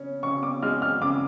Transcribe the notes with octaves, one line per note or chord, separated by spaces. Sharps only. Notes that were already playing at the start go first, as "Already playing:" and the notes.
Already playing: C#3 C#4
C#3 C#6
D6
G#3 F6
F6
C#3 D6